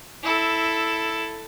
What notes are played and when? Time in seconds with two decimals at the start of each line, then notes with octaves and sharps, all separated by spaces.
0.23 E4 A4